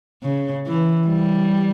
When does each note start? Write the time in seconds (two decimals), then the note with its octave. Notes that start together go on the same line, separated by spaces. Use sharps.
0.23 C#3
0.66 E3
1.08 G3